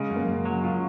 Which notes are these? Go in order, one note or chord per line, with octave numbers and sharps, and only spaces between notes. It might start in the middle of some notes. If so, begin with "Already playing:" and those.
Already playing: C#3 G#3
F#2
A#3
F#2
F#3
C#3 F4